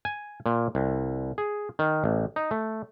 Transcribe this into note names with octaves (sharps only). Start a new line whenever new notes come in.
G#5
A#2
C2
G#4
D#3
A1
D#4
A3